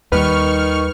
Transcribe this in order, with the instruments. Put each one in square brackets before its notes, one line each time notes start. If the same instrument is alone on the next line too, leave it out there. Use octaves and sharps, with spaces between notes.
[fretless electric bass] D#2 G3 [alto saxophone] D#3 [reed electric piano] B4 [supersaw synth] C#6 F6